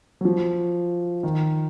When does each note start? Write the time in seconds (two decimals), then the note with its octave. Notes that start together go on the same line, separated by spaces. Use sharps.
0.21 F#3
0.25 F3
1.23 D#3